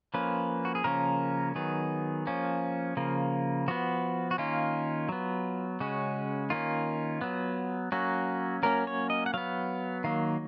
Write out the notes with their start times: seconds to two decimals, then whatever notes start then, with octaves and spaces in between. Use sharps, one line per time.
0.14 F3 A#3 C#4 B4
0.65 F#4
0.75 G#4
0.84 C#3 F3 A#3 C#4 A#4
1.55 D#3 F#3 B3 G#4
2.27 F3 A#3 C#4
2.97 C#3 F3 A#3
3.68 F3 B3 F#4
4.31 F#4
4.38 D#3 A#3 C#4 F4
5.09 F#3 B3
5.80 C#3 G#3 C#4 F#4
6.50 D#3 A#3 C#4 F4
7.21 F#3 B3
7.92 F#3 A#3 C#4 F#4
8.63 F#3 A#3 C#4 A#4
8.87 C#5
9.10 D#5
9.26 F#5
9.34 F#3 B3 F5
10.04 D#3 F#3 A#3 F5